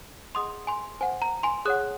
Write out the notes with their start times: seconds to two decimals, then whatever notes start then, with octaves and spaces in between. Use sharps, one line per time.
0.35 G#4 D#5 F#5 C6 D#6
0.67 G#5 C6
1.01 C5 F#5 G#5
1.22 A#5
1.43 G#5 C6
1.65 G#4 C#5 F#5 D#6 F#6